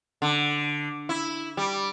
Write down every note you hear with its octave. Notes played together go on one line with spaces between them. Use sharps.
D3
E4
G3